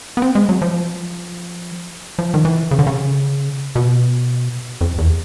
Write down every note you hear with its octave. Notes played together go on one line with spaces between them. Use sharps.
B3
C4
G#3
F#3
F3
F3
D#3
E3
C#3
D3
C#3
B2
F2
E2